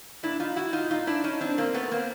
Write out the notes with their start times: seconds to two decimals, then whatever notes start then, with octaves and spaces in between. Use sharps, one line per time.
0.23 A#2 D4 E4
0.40 D#4 F4
0.56 E4 F#4
0.73 D#4 F4
0.90 A#2 D#4 F4
1.07 D4 E4
1.24 C#4 D#4
1.41 C4 D4
1.58 A#2 A#3 C4
1.74 A3 B3
1.91 A#3 C4